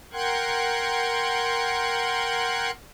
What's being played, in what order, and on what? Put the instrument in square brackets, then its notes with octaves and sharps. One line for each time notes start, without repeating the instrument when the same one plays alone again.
[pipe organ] A#4 F#5 G5 C6 F#6 G#6